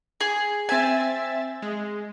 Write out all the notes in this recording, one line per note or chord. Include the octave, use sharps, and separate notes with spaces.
G#4
C4 E5 G#5 A6
G#3